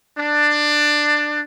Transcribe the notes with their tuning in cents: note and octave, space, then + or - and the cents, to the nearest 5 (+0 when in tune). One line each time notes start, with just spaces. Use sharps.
D4 +15